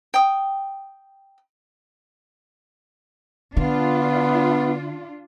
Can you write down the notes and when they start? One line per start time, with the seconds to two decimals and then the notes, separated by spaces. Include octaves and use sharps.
0.14 G5 D#6
3.57 D3 B3 D4 F4